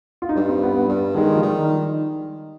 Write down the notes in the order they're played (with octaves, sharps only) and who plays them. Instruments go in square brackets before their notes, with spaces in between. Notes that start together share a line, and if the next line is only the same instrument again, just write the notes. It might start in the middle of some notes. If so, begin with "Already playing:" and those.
[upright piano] F4
D#4
[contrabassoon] G2 [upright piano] D4
[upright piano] C4
B3
B3
[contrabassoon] G2 [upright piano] G3
[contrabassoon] D#3 [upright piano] G#3
[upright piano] F3
[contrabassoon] D#3 [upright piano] G3